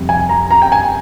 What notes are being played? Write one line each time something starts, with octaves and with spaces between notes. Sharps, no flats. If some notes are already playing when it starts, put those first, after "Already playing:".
Already playing: F2 C3 G3
G#5
A#5
A#5
G5
G#5